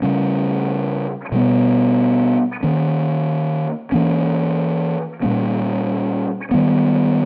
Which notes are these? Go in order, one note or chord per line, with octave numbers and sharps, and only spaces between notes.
C#3 G3 C#4
B2 G3 B3
D#3 A#3 C#4
E3 A#3 C#4
A#2 G3 A#3 C#4
D#3 G3 B3